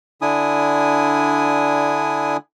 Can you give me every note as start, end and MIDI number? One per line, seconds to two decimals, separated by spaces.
0.22 2.37 50
0.22 2.37 62
0.22 2.37 64
0.22 2.37 80
0.22 2.37 87